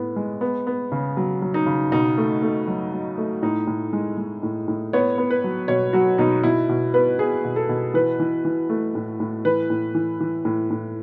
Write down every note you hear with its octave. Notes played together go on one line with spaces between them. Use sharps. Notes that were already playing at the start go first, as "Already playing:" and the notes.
Already playing: A2 B3
G#3
B3
B3
C#3
F#3
F#3
D#4
C#3
B2 D#4
A3
A3
F#3
F#3
A3
A2 D#4
A2
G#3
G#3
A2
A2
B3 C#5
B3
B4
F#3
B2 C#5
F#3 F#4
B2 D#4
B2 E4
B2
B3 B4
B3 G#4
B2
A4
B2
E3 B4
E3
E3
A3
A2
A2
E3 B4
A2
E3
E3
A2
A2